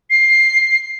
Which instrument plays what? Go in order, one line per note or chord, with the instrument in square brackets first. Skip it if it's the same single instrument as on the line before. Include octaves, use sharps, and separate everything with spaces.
[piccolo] C7